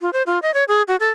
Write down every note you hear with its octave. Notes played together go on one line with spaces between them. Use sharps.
F4
C5
F4
D#5
C#5
G#4
F#4
A4